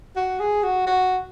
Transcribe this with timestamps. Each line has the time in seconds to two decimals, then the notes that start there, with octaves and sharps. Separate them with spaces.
0.16 F#4
0.40 G#4
0.63 F#4
0.87 F#4